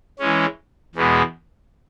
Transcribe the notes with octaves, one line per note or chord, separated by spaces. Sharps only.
E3 G#3 C#4
E2 B2 G#3 B3